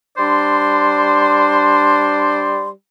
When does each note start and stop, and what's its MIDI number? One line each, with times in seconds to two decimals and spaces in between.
0.18 2.69 55
0.18 2.69 62
0.18 2.69 72
0.18 2.69 74
0.18 2.69 84